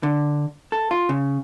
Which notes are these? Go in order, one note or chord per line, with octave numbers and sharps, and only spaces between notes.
D3
A4
F4
C#3